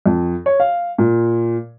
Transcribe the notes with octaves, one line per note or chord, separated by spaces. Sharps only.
F2
C#5
F5
A#2